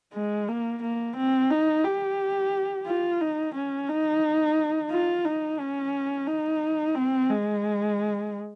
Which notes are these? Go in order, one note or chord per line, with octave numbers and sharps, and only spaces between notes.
G#3
A#3
A#3
C4
D#4
G4
F4
D#4
C#4
D#4
F4
D#4
C#4
D#4
C4
G#3